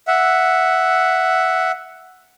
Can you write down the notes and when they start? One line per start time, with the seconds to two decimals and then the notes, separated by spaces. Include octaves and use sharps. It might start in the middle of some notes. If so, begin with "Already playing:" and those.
0.07 E5 F#5